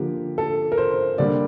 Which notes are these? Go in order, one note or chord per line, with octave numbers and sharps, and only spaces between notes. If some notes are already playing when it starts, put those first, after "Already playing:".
Already playing: D3 F3 A#3 G4
A4
A#4
C5
D3 G3 A#3 D5